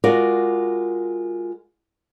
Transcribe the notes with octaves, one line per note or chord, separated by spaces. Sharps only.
G#3 F4 F#4 A#4 D5